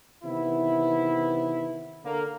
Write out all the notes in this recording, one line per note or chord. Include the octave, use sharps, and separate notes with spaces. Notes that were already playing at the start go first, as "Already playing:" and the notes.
C3 D#3 E3 B3 E4
D3 A#3